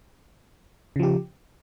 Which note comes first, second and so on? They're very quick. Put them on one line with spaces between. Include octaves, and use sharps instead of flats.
C#3 F3 G4